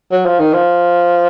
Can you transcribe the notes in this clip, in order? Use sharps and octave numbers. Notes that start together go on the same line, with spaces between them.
F#3
F3
D#3
F3